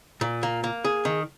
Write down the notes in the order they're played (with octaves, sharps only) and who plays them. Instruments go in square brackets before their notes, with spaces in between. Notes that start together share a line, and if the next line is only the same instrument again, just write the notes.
[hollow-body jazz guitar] A#2
A#3
A#3
G#4
D#3